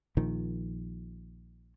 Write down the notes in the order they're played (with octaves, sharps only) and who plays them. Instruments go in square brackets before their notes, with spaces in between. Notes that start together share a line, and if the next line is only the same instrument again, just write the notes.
[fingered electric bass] A#1 A#2 D#3 F3